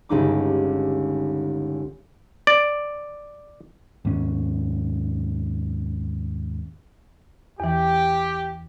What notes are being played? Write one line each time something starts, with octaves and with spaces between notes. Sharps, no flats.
G1 C#2 D#4 D6
D5
D#2 G#2 C#4
E2 E3 G4